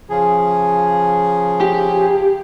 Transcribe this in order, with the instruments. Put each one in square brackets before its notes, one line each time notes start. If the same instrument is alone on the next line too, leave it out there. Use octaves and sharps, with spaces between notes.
[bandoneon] C#3 F3 G#4
[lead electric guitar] G4